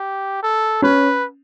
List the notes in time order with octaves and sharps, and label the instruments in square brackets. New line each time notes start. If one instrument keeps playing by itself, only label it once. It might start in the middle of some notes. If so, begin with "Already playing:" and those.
Already playing: [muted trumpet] G4
A4
[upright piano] C#4 [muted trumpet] B4